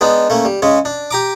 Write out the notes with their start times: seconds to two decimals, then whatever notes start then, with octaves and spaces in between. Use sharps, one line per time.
0.01 G#3 B3 D4 D#4
0.30 A3 A#3 C#4
0.45 G3
0.62 C#3 G#3 C#4
0.85 D4
1.11 G4 A#5 D6